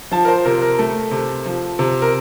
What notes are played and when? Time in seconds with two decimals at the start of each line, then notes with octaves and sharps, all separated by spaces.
0.11 F3 A5
0.25 A#4
0.28 C5
0.45 C3 A#4
0.62 A#4
0.78 A3 A4
1.11 C3
1.45 F3
1.79 C3
2.02 A#4